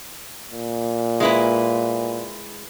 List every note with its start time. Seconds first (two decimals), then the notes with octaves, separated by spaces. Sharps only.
0.51 A#2
1.20 G#3 E4 B4